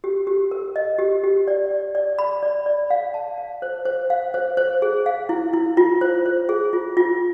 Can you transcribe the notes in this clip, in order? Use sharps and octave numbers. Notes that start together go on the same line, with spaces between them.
G4
G4
A#4
D#5
G4
G4
D5
D5
D5
B5
D5
D5
F5
A5
F5
C5
C5
F5
C5
C5
G#4
F5
E4
E4
F4
C5
C5
G#4
F4
F4